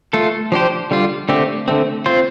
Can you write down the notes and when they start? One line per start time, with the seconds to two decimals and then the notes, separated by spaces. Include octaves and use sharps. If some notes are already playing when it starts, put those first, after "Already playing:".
0.13 A3 F4 A4
0.52 F3 D4 G4 C5
0.91 D3 G3 F4
1.29 D3 A3 C4 G4
1.68 D3 A3 C4
2.06 C4 F4 C5